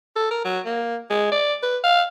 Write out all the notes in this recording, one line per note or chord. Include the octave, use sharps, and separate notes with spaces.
A4
A#4
F#3
A#3
G#3
D5
B4
F5